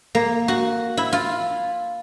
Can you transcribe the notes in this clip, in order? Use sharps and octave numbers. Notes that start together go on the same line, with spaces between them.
A#3
F#4
E4
F4